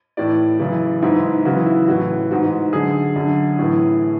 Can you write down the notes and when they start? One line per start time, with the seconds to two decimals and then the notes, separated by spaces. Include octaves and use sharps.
0.17 A2 E3 D5
0.60 F#2 C#3 E3
1.02 G#2 E3 E4
1.45 F#2 C#3 E3 F#4
1.66 E4
1.87 A2 E3 F#4
2.31 G#2 E3 F#4
2.73 F#2 D3 G#4
3.16 F#2 D3
3.59 A2 E3